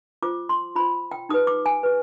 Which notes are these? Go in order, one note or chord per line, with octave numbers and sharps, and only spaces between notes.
F4 C5 D6
C6
F4 C5 B5
G5
D#4 G4 B4 D#6
D6
G#5
G4 B4